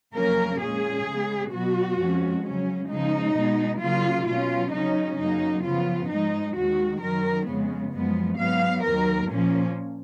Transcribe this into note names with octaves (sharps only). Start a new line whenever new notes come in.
F2 C#3 F#3 A#3 C#4 A#4
A#2 G#3 C#4 G#4
C#3 G#3 B3
B2 F#3 B3 F#4
F2 F3 G#3 C#4
C#3 F#3 C#4
C#3 F3 G#3 D#4
B2 G#3 B3
C#3 F#3 A#3 F4
B2 F#3 C#4 F4
C#3 F#3 C#4 D#4
F#2 C#3 F#3 A#3 D#4
C#3 F3 B3 F4
G#2 F3 G#3 D#4
D#2 D#3 G#3 F#4
F#2 D#3 F#3 A#4
F2 C#3 G#3 B3
F#2 F3 G#3 B3
G#2 F#3 B3 F5
D#2 D#3 F#3 A#4
A#2 F3 A#3 C#4